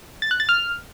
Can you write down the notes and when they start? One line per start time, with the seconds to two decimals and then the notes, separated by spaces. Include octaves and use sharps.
0.22 A6
0.31 F#6
0.40 A6
0.49 F6